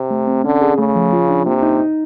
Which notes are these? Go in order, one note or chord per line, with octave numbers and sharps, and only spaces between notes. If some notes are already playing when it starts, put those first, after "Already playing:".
Already playing: C3
A3
C4
D3 C#4
G#4
C#3 A3
F3
F4
D4
C3 A#3
D#4
D#4